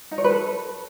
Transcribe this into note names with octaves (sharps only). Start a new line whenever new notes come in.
D#4
C#5
B4
A4